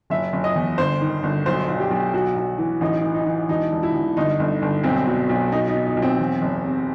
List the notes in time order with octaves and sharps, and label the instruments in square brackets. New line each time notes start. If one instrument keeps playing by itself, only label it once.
[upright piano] F#1 E5
F#1
D#5
E2
G1 C5
D#3
G1
B1 C5
B1
G4
B1
B1 F#4
B1
E3
A1 D#4
E3
D#4
E3
E1 D#4
E1
E4
E1
G1 D#4
G1
G1
B1 C4
B2
B1
B2 D#4
D#4
B2
D#4
B1
C4
E2
F#1
C3